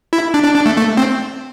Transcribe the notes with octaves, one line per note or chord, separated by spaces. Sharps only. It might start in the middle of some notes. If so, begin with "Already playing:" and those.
E4
D4
D4
D4
A3
A3
C4